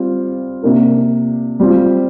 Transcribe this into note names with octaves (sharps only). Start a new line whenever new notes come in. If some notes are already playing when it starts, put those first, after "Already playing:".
Already playing: G3 C4 F4
C3 A#3 D4 A#4
G3 C4 F4